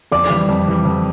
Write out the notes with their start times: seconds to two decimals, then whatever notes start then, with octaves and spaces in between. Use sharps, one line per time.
0.11 F2 D5 D6
0.30 E3 G3
0.49 F2
0.68 E3 G3
0.85 F2